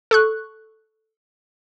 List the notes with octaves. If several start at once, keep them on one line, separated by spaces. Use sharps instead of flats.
A4 C#6 F#6